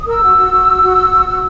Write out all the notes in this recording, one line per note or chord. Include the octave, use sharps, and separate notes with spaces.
D#6
A#4 E6
F#4
F#4
F#4
F#4
F#4
F#4
F#4
F#4